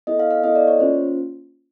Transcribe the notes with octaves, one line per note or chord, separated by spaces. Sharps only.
B3 E4 A4 D#5
F5
F5
B3 E4 A4 D#5
D5
C#5
A#3 C#4 F4 C5